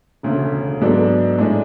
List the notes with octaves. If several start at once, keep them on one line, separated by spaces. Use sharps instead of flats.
E1 D2 C#3
G#2 F#3 B3 D4 A4
A2 G#3 D4